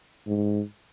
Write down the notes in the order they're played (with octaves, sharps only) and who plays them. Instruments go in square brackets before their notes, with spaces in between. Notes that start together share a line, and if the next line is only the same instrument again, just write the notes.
[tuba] G#2